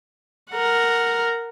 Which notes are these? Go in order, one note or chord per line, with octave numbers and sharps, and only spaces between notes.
A#4 F#5